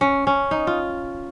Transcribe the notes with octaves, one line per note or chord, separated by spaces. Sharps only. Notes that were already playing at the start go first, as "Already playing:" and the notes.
C#4
C#4
D#4
F4